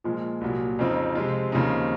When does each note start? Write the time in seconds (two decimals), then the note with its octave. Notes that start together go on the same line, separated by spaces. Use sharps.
0.04 A#2 F3 G#3
0.41 C2 A#2 F#3
0.79 F2 C#3 F3 C4 D#4
1.15 C3 F3 G#3 C4 F4
1.52 D#2 C#3 F3 C4 D#4